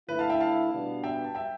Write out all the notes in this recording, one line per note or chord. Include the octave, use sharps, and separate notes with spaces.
D3 A3 E4 B4
F5 A5
E5 G5
F5 A5
B2 G3 B3 D4
E5 G5
A5
E5 G5